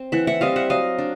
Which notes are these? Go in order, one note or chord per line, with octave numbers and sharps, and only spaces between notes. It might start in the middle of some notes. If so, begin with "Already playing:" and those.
Already playing: C4
E3 E5 F#5
E5 F#5
G3 C4 D#5 F5
E5 F#5
F#3 D#5 F5
D4